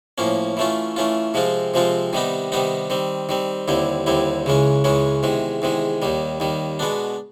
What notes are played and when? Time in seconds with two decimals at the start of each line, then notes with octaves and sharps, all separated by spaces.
0.18 A2 F3 A#3 C#4
0.57 E3 A3 C#4 F4
0.96 E3 A3 C#4 F4
1.34 C3 F3 G#3 C4 F4
1.74 C3 F3 G#3 C4 F4
2.13 C3 D#3 G3 B3 D#4
2.52 C3 D#3 G3 B3 D#4
2.90 D#3 G3 C4
3.29 D#3 G3 C4
3.68 D#2 D3 G3 C4 E4
4.06 D#2 D3 G3 C4 E4
4.46 C#2 C#3 E3 G#3 C#4
4.84 C#2 C#3 E3 G#3 C#4
5.23 E2 C3 D#3 G#3
5.62 E2 C3 D#3 G#3
6.02 D#2 D#3 G3
6.40 D#2 D#3 G3
6.79 B2 G#3 B3 D4